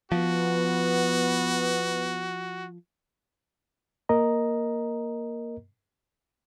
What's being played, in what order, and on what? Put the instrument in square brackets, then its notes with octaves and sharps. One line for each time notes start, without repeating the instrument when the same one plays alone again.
[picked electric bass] F3 [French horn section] B3 [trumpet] F#4
[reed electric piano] A#3 A#4 D#5 A#5